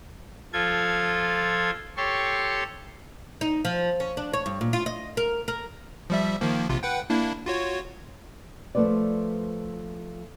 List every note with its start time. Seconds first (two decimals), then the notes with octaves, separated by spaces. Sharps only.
0.53 F3 F4 A4 G#6
1.97 G4 A4 C#5 C6 C#6
3.41 D#4
3.65 F3
4.00 C#4
4.17 D4
4.33 C#5
4.46 G2
4.61 A#2
4.73 F4
4.86 D#5
5.17 A#4
5.48 A#4
6.10 F3 G3 E5
6.41 D#3 F3 A#3
6.69 A#1 C3 F4
6.83 B4 F#5 G5
7.10 A#3 D4 E4
7.46 F4 F#4 C#5
8.75 F3 A3 B4 C5 D5